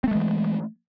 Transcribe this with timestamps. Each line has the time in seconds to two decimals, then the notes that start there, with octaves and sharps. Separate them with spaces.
0.04 C4
0.08 A3
0.11 G#3
0.15 E3